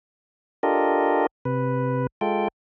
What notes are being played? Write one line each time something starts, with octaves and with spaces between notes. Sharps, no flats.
D4 F4 G4 A4 A#4 D#5
C3 B4
G#3 F4 A4 G5